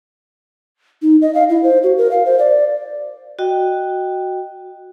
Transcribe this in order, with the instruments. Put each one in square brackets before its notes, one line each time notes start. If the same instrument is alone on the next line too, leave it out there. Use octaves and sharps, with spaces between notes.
[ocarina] D#4
D#5
F5
E4
C5
F#4
A#4
F5
C5
D5
[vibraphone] F#4 D#5 G5